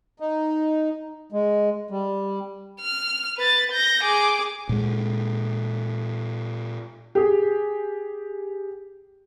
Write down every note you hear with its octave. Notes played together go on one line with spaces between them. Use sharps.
D#4
G#3
G3
F6
B4 A6
G6 A#6
G#4 D6
A#2 G#3
G4 G#4